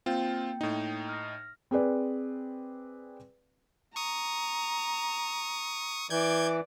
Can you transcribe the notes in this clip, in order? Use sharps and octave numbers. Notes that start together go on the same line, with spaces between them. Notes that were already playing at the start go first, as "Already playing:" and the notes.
A#3 C4 F4 G5
A2 D#4
F6 A#6
C4 G#4 B4 D5
A#5 C#6 D#6
E3 D5 D6 G6 G#6